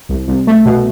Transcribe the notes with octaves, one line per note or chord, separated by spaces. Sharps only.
C2
C2
A3
B2